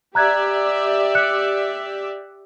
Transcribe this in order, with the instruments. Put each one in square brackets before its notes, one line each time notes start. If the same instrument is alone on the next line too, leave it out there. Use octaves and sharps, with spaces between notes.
[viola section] G4 D5 E5 [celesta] A#5 F#6 G#6
[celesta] F#6 C#7